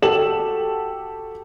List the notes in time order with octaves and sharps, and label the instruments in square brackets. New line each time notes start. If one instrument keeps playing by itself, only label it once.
[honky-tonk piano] F#4 G4 A4 E7 F#7